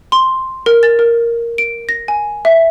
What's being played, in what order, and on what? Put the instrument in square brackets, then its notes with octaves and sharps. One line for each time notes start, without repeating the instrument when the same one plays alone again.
[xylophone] C6
A#4
A6
A#4
D7
A#6
G#5
E5